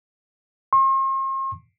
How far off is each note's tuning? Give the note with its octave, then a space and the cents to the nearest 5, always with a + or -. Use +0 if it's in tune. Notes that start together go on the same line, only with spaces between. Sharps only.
C6 +45